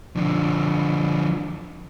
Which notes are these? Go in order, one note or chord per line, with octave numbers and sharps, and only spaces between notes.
D3 F3